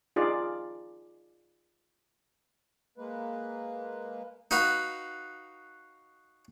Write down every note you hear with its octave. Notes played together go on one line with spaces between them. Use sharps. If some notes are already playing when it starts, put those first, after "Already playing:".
D#4 F4 G#4 D5
G#3 A#3 B4
D#4 F#4 B4 F5